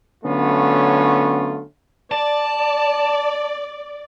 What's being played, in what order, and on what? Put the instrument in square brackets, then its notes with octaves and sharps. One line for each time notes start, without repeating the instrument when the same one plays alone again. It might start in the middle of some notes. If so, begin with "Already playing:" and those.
[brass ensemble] D3 F#3 A3 B3 C#4 F4
[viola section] D5 [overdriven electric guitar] A5